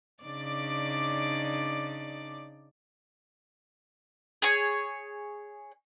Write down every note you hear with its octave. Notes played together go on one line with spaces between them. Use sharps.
C#3 D4 D#4 D5 D6 A6
G#4 C#5